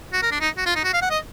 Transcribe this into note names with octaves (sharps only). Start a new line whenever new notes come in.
F#4
A#4
D4
D#4
F#4
F4
D#4
F#4
F5
F#5
D#5